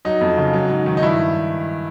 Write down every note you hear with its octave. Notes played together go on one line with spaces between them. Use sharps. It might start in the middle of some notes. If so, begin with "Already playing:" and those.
F#3 D#4
F2
C#3
F#3
G#2
D#3
D#4
G2 E4